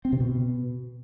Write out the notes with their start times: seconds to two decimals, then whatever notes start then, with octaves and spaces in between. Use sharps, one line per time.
0.05 C4
0.12 C3
0.20 B2